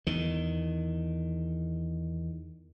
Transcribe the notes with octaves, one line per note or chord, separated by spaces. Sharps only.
E2 D#3